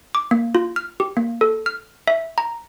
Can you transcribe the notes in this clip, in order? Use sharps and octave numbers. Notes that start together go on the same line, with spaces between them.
D6
A#3
F4
F6
G4
A#3
A4
F6
E5
A#5